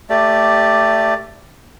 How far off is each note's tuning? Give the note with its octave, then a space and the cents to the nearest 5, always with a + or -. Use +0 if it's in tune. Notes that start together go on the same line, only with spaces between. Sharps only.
A3 +15 G4 +0 D5 +0